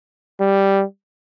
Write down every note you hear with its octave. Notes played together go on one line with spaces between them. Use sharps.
G3